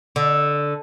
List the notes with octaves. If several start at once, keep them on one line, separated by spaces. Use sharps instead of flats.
D3